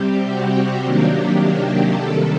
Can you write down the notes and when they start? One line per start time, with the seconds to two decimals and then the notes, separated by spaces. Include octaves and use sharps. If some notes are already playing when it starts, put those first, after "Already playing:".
Already playing: C3 G3 C4 G4
0.28 F#4
0.84 C3 D#3 F#3 A#3 D4 G4
1.95 C3 D#3 G3 A4